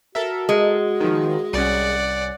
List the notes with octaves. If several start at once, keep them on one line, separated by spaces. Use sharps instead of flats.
F#4 A4 A#4 E5
G#3
D#3 F3
C2 C#4 D5 F#5